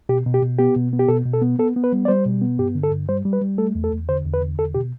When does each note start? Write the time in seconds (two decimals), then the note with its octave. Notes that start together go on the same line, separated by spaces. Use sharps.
0.09 B2 G4
0.26 B2
0.34 G4
0.42 B2
0.59 B3 G4
0.76 B2
0.93 B3
0.99 G4
1.09 B2 A4
1.26 B2
1.33 A4
1.42 B3
1.59 B3 A4
1.76 B3
1.84 B4
1.93 G3
2.05 D5
2.08 G3 C5
2.26 B2
2.42 B3
2.58 G2 G4
2.75 D3
2.84 A4
2.91 G2
3.09 G3 C5
3.25 G3
3.33 B4
3.42 G3
3.58 A3 A4
3.75 E2
3.84 A4
3.92 E2
4.09 D3 C5
4.25 E2
4.34 B4
4.41 D3
4.58 E2 A4
4.75 B2 G4